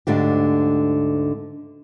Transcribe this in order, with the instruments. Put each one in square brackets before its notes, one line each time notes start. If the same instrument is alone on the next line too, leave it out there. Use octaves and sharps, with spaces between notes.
[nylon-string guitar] D2 G#2 D3 D4 G4